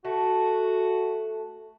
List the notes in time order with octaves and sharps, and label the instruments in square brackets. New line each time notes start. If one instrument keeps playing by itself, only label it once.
[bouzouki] A3 [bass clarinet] F#4